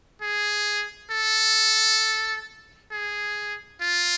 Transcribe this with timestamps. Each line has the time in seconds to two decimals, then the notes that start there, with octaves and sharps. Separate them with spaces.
0.22 G#4
1.11 A4
2.91 G#4
3.81 F4